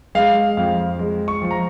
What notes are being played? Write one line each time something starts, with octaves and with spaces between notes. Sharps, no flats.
G#3 F5
F2 F5
G#3
C#6
F3
A#5